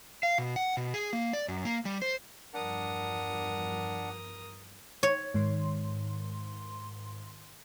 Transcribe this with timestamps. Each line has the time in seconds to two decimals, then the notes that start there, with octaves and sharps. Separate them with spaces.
0.23 F5
0.38 B2
0.56 F#5
0.77 B2
0.94 G#4
1.13 A#3
1.33 D5
1.48 F#2
1.65 A#3
1.85 G3
2.02 C5
2.54 E2 G2 F3 D4 A#4 F#5 D#6
5.03 C#5
5.34 G#2 D#3 C6